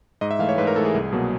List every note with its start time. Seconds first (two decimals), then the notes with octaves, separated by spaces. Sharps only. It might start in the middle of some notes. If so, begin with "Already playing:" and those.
0.21 G#2 D#5
0.31 E5
0.39 E3 A3 F5
0.49 C#5
0.58 G#2 B4
0.67 A#4
0.76 A3 A4
0.80 E3
0.85 G#4
0.94 C2
1.12 B2 F#3 A#3